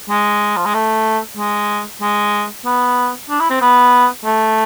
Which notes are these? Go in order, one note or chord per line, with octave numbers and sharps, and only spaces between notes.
G#3
F3
G#3
A3
G#3
G#3
B3
D4
E4
C4
B3
A3